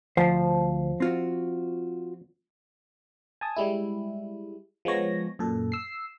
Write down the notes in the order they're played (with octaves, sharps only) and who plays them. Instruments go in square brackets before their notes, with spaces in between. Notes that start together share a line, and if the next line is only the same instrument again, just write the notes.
[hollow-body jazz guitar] D2 C5 [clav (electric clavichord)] F3
[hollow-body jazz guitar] C4 F4 F#4
[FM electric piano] G#5 A5 D#6
G3 G#3 E4
F3 G#3 B3 C#5 A#6
F#2 A#2 A4
E6 C7